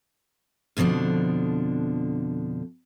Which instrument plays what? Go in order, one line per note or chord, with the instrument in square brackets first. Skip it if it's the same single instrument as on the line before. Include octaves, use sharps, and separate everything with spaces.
[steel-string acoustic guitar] F2 B2 D3 F3 D4